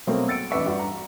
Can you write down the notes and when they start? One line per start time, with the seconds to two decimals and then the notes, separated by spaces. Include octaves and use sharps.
0.07 B2 F#3 A3 A#3 C4 C#4
0.28 E6 A6 C#7 D7
0.51 A1 D4 B4 E5 C#6
0.66 G2 F#4
0.79 A#5